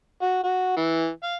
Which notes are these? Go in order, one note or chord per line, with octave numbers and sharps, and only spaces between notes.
F#4
F#4
E3
F5